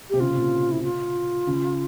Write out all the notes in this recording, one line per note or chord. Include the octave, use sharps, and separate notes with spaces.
C3 G4
C#3 F4
C3
A#2
E4
F4
C#3